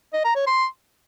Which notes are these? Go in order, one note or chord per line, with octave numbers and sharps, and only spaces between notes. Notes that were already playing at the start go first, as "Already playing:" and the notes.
D#5
A#5
C#5
C6